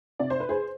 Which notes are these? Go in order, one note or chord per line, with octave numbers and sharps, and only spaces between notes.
C3 D5
C5
B4
G#4 C5